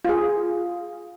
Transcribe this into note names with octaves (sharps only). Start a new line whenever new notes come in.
F4 G#4